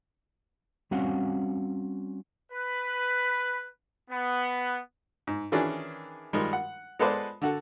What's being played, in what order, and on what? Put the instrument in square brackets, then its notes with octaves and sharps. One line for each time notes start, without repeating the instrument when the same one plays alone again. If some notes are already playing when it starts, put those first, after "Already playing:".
[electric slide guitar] G3 C4 C#4 F#4 F5 F#5
[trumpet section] B4
B3
[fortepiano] G#2
D#3 E3 C#4 D4 G#4 D5
D#3 F3 G3 G#3
F#5
G#3 B3 A4 B4 C5 D5
D3 F#4 A4